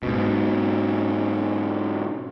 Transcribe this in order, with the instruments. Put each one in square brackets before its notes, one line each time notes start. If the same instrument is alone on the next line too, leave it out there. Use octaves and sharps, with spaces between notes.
[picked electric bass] G#2 B2 [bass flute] C#4